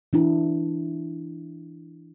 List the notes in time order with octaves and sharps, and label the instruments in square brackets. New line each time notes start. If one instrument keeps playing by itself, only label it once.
[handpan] E3 D4 E4